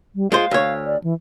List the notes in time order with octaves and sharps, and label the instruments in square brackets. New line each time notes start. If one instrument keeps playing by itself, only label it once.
[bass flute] G3
[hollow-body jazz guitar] G#3 F4 C5 [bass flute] F5
[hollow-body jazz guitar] D2 C#5
[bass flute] D5
E3